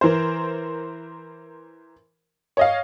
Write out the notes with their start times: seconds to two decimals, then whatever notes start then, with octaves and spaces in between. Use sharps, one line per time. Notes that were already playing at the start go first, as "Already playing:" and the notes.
0.01 E3 A#4 C5
2.57 C#5 D#5 F5